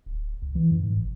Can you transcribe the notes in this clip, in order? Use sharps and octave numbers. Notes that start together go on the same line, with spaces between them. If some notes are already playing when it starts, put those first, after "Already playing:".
D1
C2
E3
F#2
G#2
G1